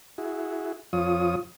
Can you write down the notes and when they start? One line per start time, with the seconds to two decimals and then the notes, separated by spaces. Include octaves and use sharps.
0.18 E4 F#4 G#4
0.93 F2 F3 F4 C#5 D#6